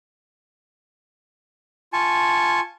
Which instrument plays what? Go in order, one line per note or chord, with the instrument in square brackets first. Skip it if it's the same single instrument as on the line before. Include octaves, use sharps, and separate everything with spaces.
[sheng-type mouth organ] F4 G#5 A5 C#6